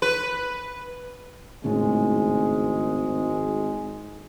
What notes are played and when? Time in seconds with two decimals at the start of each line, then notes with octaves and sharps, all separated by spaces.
0.02 B4
1.64 G#1 A2 C#3 G#3